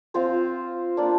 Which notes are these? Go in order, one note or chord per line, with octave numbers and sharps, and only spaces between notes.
C4 F4 C5 F5
A#3 D4 F4 D5